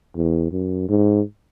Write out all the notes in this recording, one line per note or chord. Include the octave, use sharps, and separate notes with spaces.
E2
F#2
G#2